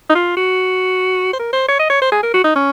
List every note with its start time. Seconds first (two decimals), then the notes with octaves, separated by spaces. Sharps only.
0.09 D#4
0.15 F4
0.37 F#4
1.33 C5
1.39 A#4
1.53 C5
1.68 C#5
1.79 D#5
1.89 C#5
2.01 C5
2.12 G#4
2.23 A#4
2.34 F#4
2.44 D#4
2.55 C#4